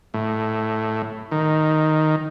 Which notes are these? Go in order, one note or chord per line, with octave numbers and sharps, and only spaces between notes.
A2
D#3